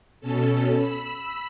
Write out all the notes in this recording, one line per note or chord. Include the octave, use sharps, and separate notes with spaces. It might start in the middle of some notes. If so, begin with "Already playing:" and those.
B2 C#4 A4
B5 E6